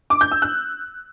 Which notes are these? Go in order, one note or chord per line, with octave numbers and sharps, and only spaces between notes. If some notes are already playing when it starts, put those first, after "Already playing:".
D6
G6
E6
F#6